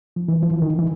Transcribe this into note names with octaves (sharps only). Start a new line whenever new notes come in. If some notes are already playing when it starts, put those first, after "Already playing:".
F3
E3
F3
D#3
E3